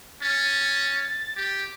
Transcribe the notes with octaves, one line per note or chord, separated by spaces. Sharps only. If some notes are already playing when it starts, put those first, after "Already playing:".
C#4 A6
G4